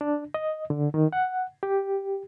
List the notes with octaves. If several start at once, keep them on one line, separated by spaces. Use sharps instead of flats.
D4
D#5
D3
D#3
F#5
G4